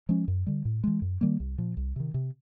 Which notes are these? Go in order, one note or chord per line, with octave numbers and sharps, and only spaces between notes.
F3 G#3 C#4
F#2
D3 G3
A2
E3 G#3
F#2
D#3 G3 A#3
C2
A#2 F3
C2
C3 D#3
C3